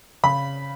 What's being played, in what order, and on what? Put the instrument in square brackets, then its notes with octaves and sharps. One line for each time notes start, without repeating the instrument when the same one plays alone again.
[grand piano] C#3 B5